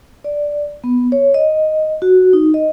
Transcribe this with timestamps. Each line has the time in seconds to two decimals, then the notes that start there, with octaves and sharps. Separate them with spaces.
0.24 D5
0.84 B3
1.12 C#5
1.34 D#5
2.02 F#4
2.33 D#4
2.54 D#5